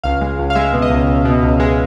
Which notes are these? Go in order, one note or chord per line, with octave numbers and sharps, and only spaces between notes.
C#2 F5
G#3
C#2
F5
G#3 E5
B2
D#5
C#2
C#2
B2
C#2
G#3